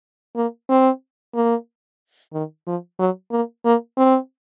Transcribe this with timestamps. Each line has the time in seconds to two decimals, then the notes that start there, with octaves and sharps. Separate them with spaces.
0.36 A#3
0.70 C4
1.35 A#3
2.33 D#3
2.67 F3
2.99 F#3
3.31 A#3
3.65 A#3
3.97 C4